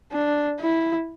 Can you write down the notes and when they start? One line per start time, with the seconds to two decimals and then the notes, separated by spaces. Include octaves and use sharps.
0.12 D4
0.60 E4